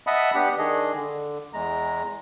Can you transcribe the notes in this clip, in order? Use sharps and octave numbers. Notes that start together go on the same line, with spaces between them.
D#5 E5 F#5 A5 B5 D#6
B3 D4 G4 F#5
D#3 D4 G#4 D#5
D3
E2 G#3 A#5